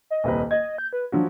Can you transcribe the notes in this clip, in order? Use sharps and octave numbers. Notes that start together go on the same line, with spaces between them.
D#5
D#1 C2 B4
D#5 G#6
G6
B4
F3 F#3 D4 F#4